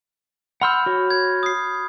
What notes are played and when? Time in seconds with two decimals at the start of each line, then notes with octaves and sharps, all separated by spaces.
0.61 F#5 B5 C6 E6 F6 G6
0.86 F#4 C#5
1.10 G#6
1.43 D#6 C7